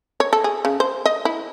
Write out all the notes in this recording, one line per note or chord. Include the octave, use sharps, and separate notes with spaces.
C#5
A4
G#4
C#3
C5
D#5
E4